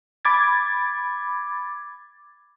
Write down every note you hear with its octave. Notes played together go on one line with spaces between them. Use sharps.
B5 D6 G#6 A6